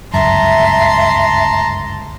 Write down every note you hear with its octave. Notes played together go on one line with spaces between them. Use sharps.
G1 C#2 F#2 E5 A5 A#5 C6